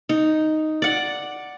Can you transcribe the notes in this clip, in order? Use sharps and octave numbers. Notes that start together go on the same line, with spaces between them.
D#4
D5 F#5